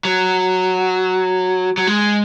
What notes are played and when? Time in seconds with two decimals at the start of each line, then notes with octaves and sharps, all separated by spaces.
0.05 F#3
1.78 F#3
1.87 G#3